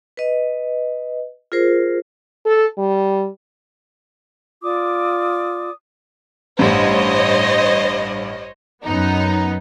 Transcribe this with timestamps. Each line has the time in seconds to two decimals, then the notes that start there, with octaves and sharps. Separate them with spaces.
0.17 B4 D#5
1.52 F4 G#4 A#4 C5
2.46 A4
2.78 G3
4.63 F4 D5 D6 D#6
6.59 A1 G2 C5 C#5 D#5
8.83 F#2 B3 D#4